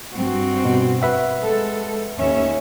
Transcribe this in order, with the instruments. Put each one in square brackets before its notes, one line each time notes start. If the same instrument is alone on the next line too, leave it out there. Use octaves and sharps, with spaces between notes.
[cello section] G2 C4 F#4
[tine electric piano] B2
B4 E5 F#5
[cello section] G#3 A4
D#2 C#4 E5